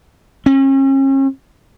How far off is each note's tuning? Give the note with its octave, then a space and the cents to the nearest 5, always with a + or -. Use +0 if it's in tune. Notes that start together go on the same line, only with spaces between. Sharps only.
C#4 -40